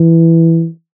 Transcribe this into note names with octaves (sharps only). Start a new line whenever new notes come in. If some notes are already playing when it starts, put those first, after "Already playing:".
Already playing: E3